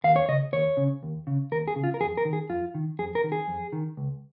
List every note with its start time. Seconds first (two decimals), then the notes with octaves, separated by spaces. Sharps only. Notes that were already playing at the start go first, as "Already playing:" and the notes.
0.04 D#2 F5
0.16 C#5
0.28 C#3 D#5
0.52 D#2 C#5
0.77 C#3
1.03 D#2
1.27 C#3
1.52 D#2 A#4
1.68 G#4
1.76 C#3
1.84 F4
1.94 A#4
2.01 F2 G#4
2.17 A#4
2.25 D#3
2.33 G#4
2.49 F2 F4
2.74 D#3
2.99 F2 G#4
3.15 A#4
3.24 D#3
3.32 G#4
3.48 F2
3.73 D#3
3.97 C#2